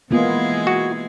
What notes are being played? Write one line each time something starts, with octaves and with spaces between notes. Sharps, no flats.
E3 G#3 A#3 B3 F4 G#4
F#4